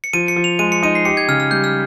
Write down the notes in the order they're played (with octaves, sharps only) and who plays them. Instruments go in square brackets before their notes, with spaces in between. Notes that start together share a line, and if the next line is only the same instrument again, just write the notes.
[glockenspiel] C#7
[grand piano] F3 [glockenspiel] D#7
[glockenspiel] C#7
[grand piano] F3
[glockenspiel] F7
[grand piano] G#3 [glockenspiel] D#7
[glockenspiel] C#7
[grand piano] D#4 [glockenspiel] D#7
[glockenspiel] C7
[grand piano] G4 [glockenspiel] C#7
[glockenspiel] G#6
[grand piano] C#3 [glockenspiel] F6
[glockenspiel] F6
[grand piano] G3 [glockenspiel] G6
[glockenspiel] F6